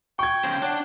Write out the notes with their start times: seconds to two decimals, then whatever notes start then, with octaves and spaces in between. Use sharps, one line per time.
0.19 G5 C#6 G#6
0.44 C#3 C5 G6
0.62 D4 C#5 F#5